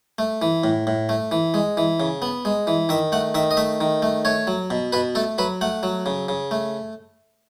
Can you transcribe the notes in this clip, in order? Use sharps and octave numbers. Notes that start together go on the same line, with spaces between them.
A3
E3
A2
A2
A3
E3
G#3
E3
C#3
B3
G#3
E3
D#3 E5
A3 F#5
D#3 E5
D#5
A3 E5
D#3
A3
A3 C#5
F#3
B2
B2 B4
A3 A4
F#3 B4
A3 F#5
F#3
C#3
C#3
A3